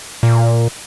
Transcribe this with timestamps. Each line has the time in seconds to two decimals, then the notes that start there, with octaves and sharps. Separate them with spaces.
0.23 A#2